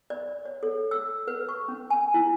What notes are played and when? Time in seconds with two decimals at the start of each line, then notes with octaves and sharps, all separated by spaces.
0.10 D5
0.45 C#5
0.63 A4
0.91 E6
1.28 B4
1.49 C#6
1.68 C#4
1.90 G#5
2.14 E4